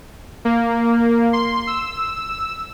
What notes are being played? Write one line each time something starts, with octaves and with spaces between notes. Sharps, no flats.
A#3
C6
E6